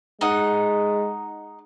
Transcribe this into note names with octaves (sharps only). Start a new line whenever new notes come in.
G#3 D#4 F#5